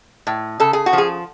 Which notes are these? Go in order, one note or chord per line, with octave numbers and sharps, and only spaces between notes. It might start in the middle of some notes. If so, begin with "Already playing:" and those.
A2
C#3 A4
G#4
F#4
F3
G#4